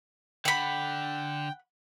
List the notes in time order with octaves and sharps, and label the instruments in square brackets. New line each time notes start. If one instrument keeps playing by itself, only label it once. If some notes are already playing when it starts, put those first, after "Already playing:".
[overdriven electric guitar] D3 [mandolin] F#5 B5 [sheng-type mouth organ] G5